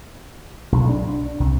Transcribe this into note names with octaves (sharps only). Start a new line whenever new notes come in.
B1
D4
C2